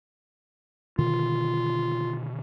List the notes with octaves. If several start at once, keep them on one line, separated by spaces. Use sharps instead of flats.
B2 D3 D#3 F4